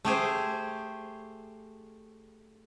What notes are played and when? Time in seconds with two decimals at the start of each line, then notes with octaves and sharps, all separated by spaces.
0.05 A3 G4 G#4 C5